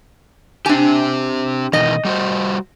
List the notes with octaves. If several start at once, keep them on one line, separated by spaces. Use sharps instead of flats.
C4 D4 G4 G#5
B2 D#3 E3 D#5
G3 F#4 C5